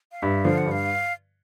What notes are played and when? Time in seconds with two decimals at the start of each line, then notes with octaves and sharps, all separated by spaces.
0.12 F5
0.22 G2 E5
0.44 D3 F3 F5
0.58 F#5
0.66 G2
0.71 F5